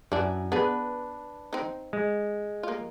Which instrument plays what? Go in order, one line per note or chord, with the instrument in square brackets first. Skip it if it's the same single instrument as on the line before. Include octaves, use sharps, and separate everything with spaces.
[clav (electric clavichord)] F#2 G#5 [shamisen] E3 D4
[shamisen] B3 G#4 [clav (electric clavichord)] D4 B4
[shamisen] C4 D#4
[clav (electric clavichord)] G#3
[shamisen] A#3 F4